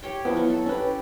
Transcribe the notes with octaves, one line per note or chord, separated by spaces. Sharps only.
G4 C#5 G5
F3 F#3 B3 E4
F#3
A4
C#4 E4 G4 B4